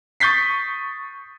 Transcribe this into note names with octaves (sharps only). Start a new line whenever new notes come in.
C#6 D#6 G6 A6 B6 C7